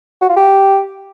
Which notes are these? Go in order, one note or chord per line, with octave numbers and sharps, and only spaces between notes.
F#4
F4
G4